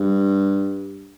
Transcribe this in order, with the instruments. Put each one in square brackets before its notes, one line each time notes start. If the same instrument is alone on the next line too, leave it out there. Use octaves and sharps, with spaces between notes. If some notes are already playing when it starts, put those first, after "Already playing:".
Already playing: [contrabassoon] G2